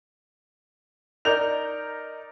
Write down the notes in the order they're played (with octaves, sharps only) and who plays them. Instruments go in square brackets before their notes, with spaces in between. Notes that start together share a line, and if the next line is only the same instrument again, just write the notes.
[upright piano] D#4 A#4 D5 G6 F7